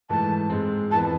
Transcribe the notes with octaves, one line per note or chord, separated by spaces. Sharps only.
G#2 E3 A3 A5
G#2 G#3 C4
F2 E3 B3 A5